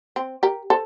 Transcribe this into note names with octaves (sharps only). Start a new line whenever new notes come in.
C4
G4 A#4
A4 C5